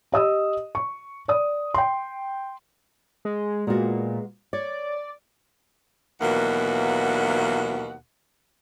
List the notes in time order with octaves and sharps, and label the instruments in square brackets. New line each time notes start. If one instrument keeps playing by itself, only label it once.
[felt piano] G4 D#5 D#6 E6
C#6
D5 D#6
G5 C6
[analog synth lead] G#3
[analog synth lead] A#2 [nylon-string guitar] G#3 B3 F#4
[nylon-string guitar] C#5 [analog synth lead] D5
[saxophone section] D#2 B2 E3 F#3 A#3 F#5